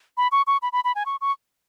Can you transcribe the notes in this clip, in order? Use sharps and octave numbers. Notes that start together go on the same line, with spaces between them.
B5
C#6
C#6
B5
B5
B5
G#5
C#6
C#6